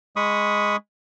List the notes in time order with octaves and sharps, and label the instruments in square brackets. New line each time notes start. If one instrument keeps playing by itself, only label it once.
[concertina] G#3 B5 C#6 D#6